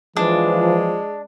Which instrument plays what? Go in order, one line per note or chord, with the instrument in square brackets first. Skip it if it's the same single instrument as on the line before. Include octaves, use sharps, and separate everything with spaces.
[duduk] E3 [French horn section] F3 [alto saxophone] G#3 [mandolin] D4